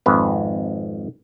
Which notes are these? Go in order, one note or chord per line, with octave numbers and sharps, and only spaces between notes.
G#1 F2 B4